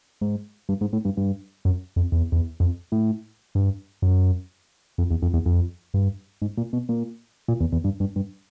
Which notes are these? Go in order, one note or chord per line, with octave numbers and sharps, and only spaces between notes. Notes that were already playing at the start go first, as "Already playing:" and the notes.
G#2
G2
G#2
A2
G2
G2
F#2
F2
E2
E2
F2
A2
G2
F#2
F2
E2
F2
E2
F2
G2
G#2
A#2
B2
A#2
A#2
E2
E2
G2
G2
G2